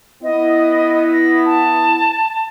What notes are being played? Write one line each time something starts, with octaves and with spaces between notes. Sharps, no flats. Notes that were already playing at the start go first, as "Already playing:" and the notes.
B3 E4 D#5
A#6
A5